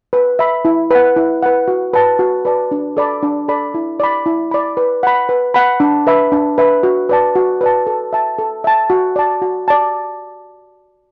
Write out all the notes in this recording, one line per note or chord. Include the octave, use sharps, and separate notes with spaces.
B4
E5 B5
E4
B4 F#5
E4
B4 F#5
F#4
B4 D5 A5
F#4
B4 D5 A5
D4
A4 D5 B5
D4
A4 D5 B5
E4
D5 B5
E4
D5 B5
B4
F#5 B5
B4
F#5 B5
D4
B4 E5 B5
D4
B4 E5 B5
F#4
B4 D5 A5
F#4
B4 D5 A5
A4
E5 A5
A4
E5 A5
F#4
D5 A5
F#4
D5 A5